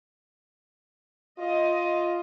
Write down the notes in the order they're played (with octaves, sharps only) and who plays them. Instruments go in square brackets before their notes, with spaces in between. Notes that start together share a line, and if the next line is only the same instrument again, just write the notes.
[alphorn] F4 [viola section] D#5